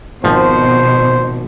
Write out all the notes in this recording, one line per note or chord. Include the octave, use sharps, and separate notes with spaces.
G#1 B2 F3 C5